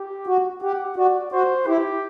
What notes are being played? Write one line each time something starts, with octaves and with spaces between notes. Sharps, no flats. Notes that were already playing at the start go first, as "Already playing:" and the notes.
Already playing: G4
F#4
G4 F#5
F#4 D5
F#4 C5
E4 G4